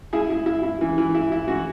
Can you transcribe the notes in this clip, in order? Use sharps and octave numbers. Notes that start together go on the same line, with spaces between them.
E4 G#4
E4
E4
E4
E3
E3
E4
E4
E3 F#4